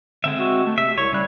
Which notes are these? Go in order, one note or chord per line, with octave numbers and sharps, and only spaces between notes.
D3 G#3 C4 E5
F#4
A3
C3 E5
C2 C#5
C#3 G3 F#6